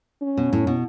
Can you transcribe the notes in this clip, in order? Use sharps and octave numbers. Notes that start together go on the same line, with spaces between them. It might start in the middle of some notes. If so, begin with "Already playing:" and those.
C#4
B2
A2
B2